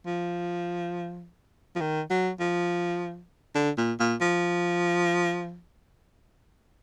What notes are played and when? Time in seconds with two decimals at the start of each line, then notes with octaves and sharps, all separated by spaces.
0.06 F3
1.75 F3
1.81 D#3
2.10 F#3
2.40 F3
3.55 D3
3.77 A#2
4.00 A#2
4.21 F3